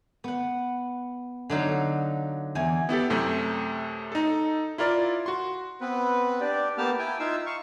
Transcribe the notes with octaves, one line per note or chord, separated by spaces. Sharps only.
B3 F#5
D3 F#3 D#4 F5
E2 G#5
B3 E4 G4 A4
F#2 C3 A3 G6
D#4 A4
E4 F4 A#4 D5
F#4 C6
B3 C4 B4
D4 G4 D5
A#3 B3 G4 A5 F6
E4 G5 G#5
D#4 F4 E5 F5 E6
F5 C#6